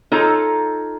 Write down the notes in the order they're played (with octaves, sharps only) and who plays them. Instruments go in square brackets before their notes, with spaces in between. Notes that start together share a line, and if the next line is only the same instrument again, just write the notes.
[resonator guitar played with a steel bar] D#4 F4 A4 C#5 A#5